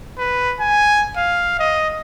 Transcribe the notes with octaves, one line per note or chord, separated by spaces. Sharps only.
B4
G#5
F5
D#5